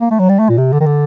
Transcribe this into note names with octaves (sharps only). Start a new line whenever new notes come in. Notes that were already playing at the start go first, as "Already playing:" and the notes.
A#3
A3
F#3
G3
A3
A#2
C3
D3
D#3
D3